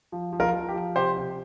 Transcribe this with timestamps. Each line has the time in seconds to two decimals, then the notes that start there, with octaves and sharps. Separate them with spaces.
0.12 F3
0.33 F3
0.40 F4 A#4
0.53 F3
0.68 G4
0.74 F3
0.95 C3 G4 C5
1.17 C3